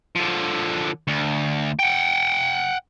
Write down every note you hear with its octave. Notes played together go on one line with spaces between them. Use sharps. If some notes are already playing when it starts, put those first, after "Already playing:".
D3 F3
D2
F#5 G5